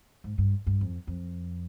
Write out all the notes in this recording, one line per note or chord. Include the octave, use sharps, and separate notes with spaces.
G#2
G2
G2
F2
F2